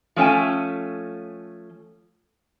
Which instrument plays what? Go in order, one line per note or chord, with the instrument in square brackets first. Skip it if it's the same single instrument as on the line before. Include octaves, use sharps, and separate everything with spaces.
[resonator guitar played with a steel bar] F3 A3 C#4 G5 G#5